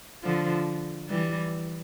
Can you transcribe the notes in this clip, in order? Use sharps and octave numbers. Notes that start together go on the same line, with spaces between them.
D3 F3
E3 G3